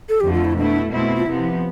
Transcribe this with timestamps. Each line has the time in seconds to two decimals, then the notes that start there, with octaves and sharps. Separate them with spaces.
0.09 A4
0.20 F2 D3 F3 A3 G4
0.33 F4
0.45 E4
0.57 B2 A3 D4 E4
0.92 B2 A3 C4 E4
1.16 F4
1.26 C3 F3 B3 E4